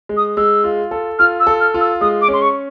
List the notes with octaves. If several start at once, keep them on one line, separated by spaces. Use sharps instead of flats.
G#3
D#6
G#3 E6
F4
A4
F4 F6
E6
A4
F6
F4
E6
G#3 D#6
D6
C#4
C6
C#6